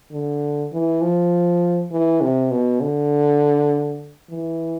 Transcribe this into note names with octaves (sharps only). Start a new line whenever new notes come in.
D3
E3
F3
E3
C3
B2
D3
E3